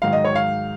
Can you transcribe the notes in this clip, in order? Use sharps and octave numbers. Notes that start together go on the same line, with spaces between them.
G#2 D#3 F#3 F5
D#5
C#5
F5